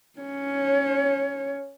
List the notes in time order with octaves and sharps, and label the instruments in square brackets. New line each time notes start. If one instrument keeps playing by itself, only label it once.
[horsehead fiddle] C#4 C#5